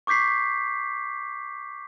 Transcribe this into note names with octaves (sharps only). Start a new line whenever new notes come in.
C#6 D6 G6 B6 C7